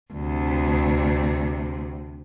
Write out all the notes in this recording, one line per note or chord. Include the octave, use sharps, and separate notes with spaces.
D2 C3